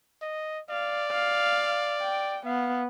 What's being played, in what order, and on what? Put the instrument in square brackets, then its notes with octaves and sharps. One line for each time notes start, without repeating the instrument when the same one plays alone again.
[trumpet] D#5
[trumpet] D5 [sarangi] F5
[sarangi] F5
G5
[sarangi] B3 [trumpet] F5